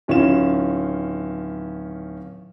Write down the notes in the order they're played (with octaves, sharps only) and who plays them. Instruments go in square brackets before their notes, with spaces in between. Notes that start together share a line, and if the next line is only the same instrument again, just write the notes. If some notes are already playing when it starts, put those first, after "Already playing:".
[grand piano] D1 D#3 C#4 E4 F4 E7